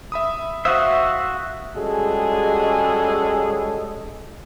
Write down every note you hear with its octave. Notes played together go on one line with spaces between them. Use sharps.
E5 B5 D#6
F#4 C5 E5 F5 D#6
G3 G#3 C#4 F#4 G#4 A4